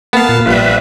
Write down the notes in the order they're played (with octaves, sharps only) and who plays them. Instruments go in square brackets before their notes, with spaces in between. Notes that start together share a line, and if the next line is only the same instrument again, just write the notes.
[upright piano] A#3 [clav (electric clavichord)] B3 [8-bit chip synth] F5 A5
[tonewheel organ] A#2
[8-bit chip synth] A#1 G3 [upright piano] F4 [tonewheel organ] B4 E5